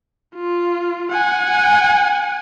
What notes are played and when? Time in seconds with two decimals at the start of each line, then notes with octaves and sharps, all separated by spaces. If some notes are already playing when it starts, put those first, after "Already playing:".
0.35 F4
1.12 F#5 G#5